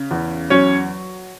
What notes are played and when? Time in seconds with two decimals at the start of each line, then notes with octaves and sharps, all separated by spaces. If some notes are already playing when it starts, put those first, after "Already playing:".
Already playing: C#3
0.11 E2
0.50 F#3 C#4 C#5